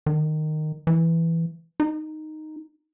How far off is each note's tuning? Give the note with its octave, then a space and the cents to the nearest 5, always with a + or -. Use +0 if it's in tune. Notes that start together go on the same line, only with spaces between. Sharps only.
D#3 -15
E3 +5
D#4 -5